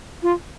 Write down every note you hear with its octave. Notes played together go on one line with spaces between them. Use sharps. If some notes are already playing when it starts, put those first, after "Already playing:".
F4